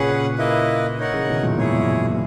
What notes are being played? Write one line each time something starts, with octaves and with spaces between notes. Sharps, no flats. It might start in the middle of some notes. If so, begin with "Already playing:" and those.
Already playing: A#2 C#3 C#4 G#4 B4 F#5
A#3 E4 B4 D#5
D#4 A#4 C#5 F#5
C#3 E3
B2 D#3
F#2 A#2
E2 G#2 E4 G#4 C#5
E2
F#2
A#2